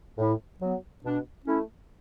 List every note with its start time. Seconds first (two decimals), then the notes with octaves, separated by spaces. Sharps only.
0.18 A2
0.60 F#3 B3
1.04 B2 D4
1.46 A3 C#4 E4